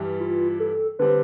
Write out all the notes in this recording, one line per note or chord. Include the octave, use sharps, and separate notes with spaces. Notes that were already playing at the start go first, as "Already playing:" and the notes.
Already playing: G2 E3 G3
F4
A4
D3 G3 C4 B4